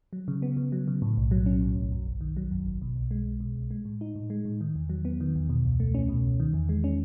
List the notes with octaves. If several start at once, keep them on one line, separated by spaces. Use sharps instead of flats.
F#3
C#3
B3
C#3
F#3
C#3
A2
B1
F#3
C#4
A2
B1
F#2
G#1
D#3
F#3
F#2
G#1
B2
B1
G#3
B1
B2
B1
G#3
A2
D#4
A2
G#3
A2
D#3
E2
F#3
B3
D#3
E2
B2
C#2
A3
C#4
B2
C#2
D#3
E2
G#3
C#4